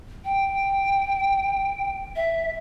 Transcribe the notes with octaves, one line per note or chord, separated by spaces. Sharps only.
G5
E5